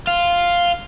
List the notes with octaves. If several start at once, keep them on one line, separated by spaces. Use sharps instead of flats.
F4